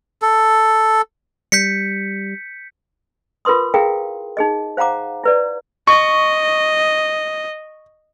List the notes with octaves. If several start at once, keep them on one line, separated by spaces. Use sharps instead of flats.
A4
G3 G6 B6 C#7
F4 A#4 B4 C6 D#6
E4 G#4 A#4 F5 G5
D#4 G#4 D#5
C5 F5 F#5 A#5 D6
E4 B4 D5
D#5 C#6